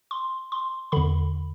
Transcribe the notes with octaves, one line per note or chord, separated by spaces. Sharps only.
C6
C6
E2 D3 B5